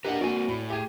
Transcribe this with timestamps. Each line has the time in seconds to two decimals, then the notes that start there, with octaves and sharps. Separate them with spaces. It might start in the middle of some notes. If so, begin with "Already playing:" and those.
0.05 D4 F4 G4 A#4 B4 D#5 F#5
0.21 A#3 C4 F#4 D5 G#5
0.48 A2 B5
0.70 G4 G#4 G5